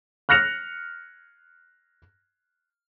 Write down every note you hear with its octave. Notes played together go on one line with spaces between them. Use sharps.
F6 F#6 A#6 C#7 F7